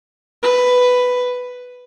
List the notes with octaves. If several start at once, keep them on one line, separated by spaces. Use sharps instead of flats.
B4